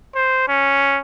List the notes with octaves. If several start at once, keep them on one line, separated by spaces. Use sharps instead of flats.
C5
C#4